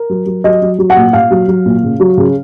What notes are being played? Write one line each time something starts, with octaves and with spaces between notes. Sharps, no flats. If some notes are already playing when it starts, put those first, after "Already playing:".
Already playing: A#4
F#3
F#3
F#3 D#5
F#3
F#3
F#5
A#2
A#2 F5
F#3
F#3
A#2
C#3
F#3
C#3